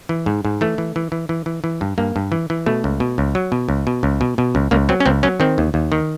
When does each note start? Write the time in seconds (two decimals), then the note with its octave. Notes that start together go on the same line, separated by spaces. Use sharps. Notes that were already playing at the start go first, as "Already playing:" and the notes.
0.09 E3
0.26 G#2
0.45 G#2
0.61 E3 A3
0.78 E3
0.96 E3
1.12 E3
1.29 E3
1.46 E3
1.64 E3
1.81 G2
1.98 G2 A#3
2.16 G2
2.32 E3
2.50 E3
2.66 B2 A3
2.84 C#2
3.00 B2
3.18 C#2
3.35 F#3
3.52 B2
3.69 C#2
3.87 B2
4.03 C#2
4.21 B2
4.38 B2
4.55 C#2
4.71 C#2 A#3
4.89 F#3 C4
5.00 C#4
5.06 C#2 C4
5.23 F#3 C#4
5.40 D#3 C4
5.58 D#2
5.74 D#2
5.92 D#3